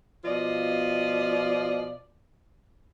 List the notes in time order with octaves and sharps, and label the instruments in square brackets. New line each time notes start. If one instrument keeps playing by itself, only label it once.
[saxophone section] B2 F3 F4 D5 D#5